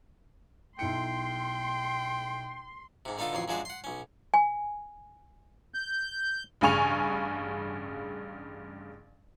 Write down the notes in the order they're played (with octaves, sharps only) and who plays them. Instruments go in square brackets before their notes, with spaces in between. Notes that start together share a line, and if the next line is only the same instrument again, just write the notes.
[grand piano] B1 E4 C#7 [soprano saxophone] G5 [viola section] C6
[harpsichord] G#2 C3
D3 B3 D#4 F4 A4
A1 F2 F#3 C6
F#2 F3 F#3 G#3 D4 C5
F#5 C6
B1 C#4
[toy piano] G#5
[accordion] G6
[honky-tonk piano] A1 G2 C#3 G#5 C#6 F7